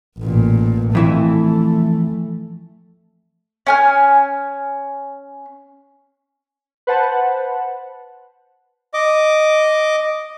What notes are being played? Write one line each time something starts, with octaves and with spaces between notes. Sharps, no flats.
A1 A#2
F2 E3 A3 E4
C#4 G#5 F6
B4 C5 F#5 A5
D#5 D6